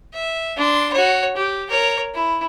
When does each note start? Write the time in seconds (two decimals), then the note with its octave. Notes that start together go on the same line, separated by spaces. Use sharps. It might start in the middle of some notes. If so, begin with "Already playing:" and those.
0.14 E5
0.57 D4 C6
0.93 F#4 C#5
1.36 G4
1.70 A#4 C#5
2.14 E4